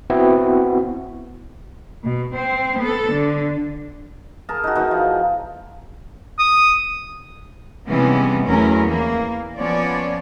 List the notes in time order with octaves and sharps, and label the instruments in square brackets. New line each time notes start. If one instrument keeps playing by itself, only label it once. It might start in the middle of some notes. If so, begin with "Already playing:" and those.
[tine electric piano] B3 C4 E4 F#4
[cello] B2
C4 C5
B3 A4
D3
[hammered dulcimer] G#4 A#4 A5
D#4 F#4
B2 E3 D#4
F3
[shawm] D#6
[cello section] C3 E3 G3 G#3 B3 C#4
E2 F#3 A3 C#4 A#4
E3 A#3
F3 B3 C#4 C#5 D5